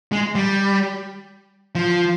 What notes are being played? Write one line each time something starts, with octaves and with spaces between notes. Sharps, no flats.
G#3
G3
F3